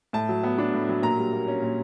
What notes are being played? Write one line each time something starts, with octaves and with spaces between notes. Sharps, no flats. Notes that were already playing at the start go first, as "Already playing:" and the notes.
A2 A5
F#3
B3
D4
A2
F#3
A#2 A#5
G3
A#3
C#4
A#2